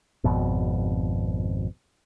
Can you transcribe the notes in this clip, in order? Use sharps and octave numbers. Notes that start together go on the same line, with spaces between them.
G#1 F2 B2